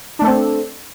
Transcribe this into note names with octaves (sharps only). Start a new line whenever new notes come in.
A3 C4 D4 A4